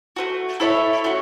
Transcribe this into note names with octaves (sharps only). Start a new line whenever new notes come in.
A3 C#4 F#4
E4 A4 C#5 E5
A3 C#4 F#4